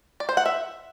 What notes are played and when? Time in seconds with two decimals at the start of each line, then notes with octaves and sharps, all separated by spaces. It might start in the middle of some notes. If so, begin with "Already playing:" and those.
0.20 D5
0.29 C5
0.37 F#5
0.46 E5